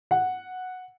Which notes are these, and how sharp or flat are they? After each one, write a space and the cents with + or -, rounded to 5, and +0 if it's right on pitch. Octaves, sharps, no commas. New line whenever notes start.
F#5 -5